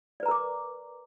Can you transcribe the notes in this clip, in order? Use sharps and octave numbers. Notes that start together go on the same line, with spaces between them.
A#4 B4 D5 A#5 D6